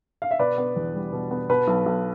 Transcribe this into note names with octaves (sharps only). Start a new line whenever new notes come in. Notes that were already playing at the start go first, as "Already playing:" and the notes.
F5
E5
B2 B4 D5
B3
E2
G3
B2
B3
B2 B4
B1
B1